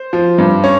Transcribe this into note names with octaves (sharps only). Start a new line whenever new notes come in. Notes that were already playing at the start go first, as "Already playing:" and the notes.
Already playing: C5
F3
G2
C#4